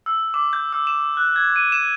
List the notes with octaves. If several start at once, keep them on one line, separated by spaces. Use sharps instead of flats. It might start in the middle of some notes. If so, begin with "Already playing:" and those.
E6
D6
G6
E6
E7
F#6
G#6
D#7
E7